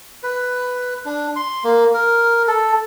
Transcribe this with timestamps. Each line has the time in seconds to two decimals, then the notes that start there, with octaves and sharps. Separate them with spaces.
0.23 B4
1.05 D4
1.36 C6
1.64 A#3
1.94 A#4
2.47 A4